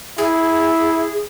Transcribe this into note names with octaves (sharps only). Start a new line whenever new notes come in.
E4 G#4